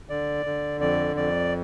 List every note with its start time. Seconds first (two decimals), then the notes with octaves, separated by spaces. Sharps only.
0.09 D3 D5
0.45 D3
0.80 F2 D5
1.16 F2 D5